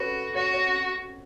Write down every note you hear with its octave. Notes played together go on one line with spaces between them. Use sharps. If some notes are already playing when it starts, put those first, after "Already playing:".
Already playing: F#4 A4 B4 C#5
F#4 C#5
C#5